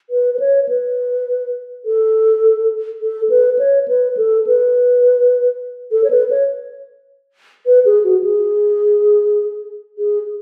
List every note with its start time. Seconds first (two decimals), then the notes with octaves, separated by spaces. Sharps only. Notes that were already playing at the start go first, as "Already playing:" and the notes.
0.10 B4
0.34 B4
0.39 C#5
0.69 B4
1.85 A4
3.01 A4
3.30 B4
3.59 C#5
3.88 B4
4.17 A4
4.47 B4
5.92 A4
6.04 C#5
6.10 B4
6.30 C#5
7.66 B4
7.85 G#4
8.04 F#4
8.24 G#4
9.98 G#4